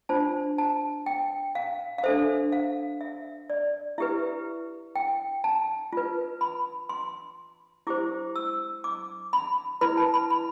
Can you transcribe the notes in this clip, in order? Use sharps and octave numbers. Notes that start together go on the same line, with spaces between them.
D4 F4 C5 A5
A5
G5
F5
F5
D4 A4 C5 E5
F5
E5
D5
E4 G4 B4 E5
G5
A5
F4 B4
B5
C6
E4 G4 C5 D6
E6
D6
B5
E4 B4 B5
A5
B5
B5